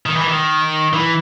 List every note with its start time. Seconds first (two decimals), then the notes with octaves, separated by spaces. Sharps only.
0.06 D#3
0.16 E3
0.28 D#3
0.93 E3